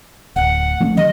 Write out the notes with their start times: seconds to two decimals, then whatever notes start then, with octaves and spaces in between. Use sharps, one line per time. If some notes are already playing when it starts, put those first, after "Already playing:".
0.36 D1 F#5
0.80 F3 A3 C#4
0.97 D#3 F#3 G3 D#5